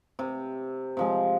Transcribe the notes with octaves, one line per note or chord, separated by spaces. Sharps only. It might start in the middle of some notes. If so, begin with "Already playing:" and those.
C3
C3 F3 G#3